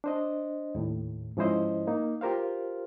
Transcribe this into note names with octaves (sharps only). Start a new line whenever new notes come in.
D4 C5 D#5
D#2 A2
G#2 F3 C#4 E4 C5 D#5
A#3 D#4
F4 G4 A#4 C5 F5